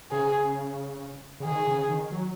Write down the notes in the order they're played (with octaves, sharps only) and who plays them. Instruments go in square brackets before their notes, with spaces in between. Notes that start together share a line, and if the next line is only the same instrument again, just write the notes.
[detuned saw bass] C#3 [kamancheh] G#4
[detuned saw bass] C#3
[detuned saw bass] D#3 [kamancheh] G#4
[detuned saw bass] C#3
D#3
F#3